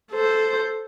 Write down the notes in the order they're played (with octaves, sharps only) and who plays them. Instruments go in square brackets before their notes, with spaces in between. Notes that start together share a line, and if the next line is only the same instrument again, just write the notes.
[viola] A4 C5